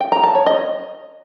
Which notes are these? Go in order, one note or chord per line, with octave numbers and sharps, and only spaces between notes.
G5
A#5
A5
C#5
D#5